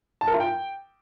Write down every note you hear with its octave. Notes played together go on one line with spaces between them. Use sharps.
A5
A#4
F4
G5